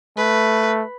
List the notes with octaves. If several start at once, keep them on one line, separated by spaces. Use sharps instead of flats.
A3 B4